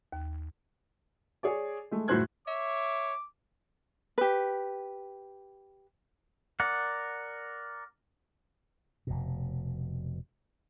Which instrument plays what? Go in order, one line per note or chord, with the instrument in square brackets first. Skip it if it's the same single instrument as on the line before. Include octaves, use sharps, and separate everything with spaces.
[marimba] D#2
[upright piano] G#4 C#5 D5
G#3 A3
F#1 A2 F#4 C5 F#6 G#6
[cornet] C#5 [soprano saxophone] E5 [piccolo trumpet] D6
[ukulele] G4 B4
[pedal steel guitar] A#4 D5 F#5
[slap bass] F1 B2